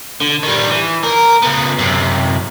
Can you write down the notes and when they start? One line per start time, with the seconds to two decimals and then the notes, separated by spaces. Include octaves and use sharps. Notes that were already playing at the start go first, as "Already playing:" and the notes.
0.21 D3
0.43 D#3 G3
0.69 E3
1.03 D#2 A#4
1.42 C#3 B3
1.78 F#2 C3